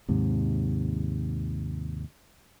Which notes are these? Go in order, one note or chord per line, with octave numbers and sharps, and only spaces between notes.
D#2 G#2 C3